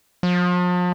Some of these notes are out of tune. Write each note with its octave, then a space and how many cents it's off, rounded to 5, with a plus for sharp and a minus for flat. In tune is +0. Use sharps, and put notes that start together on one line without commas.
F3 +40